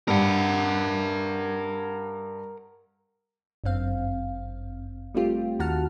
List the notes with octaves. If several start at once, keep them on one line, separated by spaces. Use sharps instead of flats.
G2 A#4 F#5
G1 F#2 C4 F5
G3 A3 C4 F4 G4
D#2 D#3 F#4 F#5 A5 F6